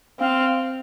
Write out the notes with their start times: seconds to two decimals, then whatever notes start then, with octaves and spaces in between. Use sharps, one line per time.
0.20 C4 F5